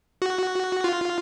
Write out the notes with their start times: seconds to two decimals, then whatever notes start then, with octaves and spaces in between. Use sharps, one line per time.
0.22 F#4
0.84 F4